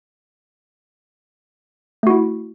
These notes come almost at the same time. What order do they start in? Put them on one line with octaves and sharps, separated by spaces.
A3 F#4 E4